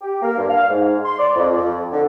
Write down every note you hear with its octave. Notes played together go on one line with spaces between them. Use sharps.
G4
A#3
G2
F5
G#2
C6
D5
F2
F2
D3